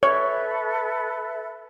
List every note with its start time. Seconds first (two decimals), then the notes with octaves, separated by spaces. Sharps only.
0.03 A4 B4 C#5 E5